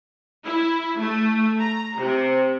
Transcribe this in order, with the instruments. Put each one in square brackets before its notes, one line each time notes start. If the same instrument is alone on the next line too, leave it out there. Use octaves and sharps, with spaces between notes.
[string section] E4
A3
A#5
C3